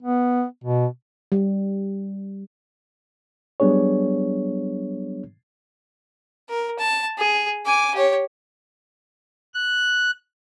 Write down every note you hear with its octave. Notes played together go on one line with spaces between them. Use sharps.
B3
B2
G3
F#3 G3 B3 D4 G#4 C#5
A#4
A5
G#4
G#5 D6
G4 C#5
F#6